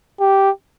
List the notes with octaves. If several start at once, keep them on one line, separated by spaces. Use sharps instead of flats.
G4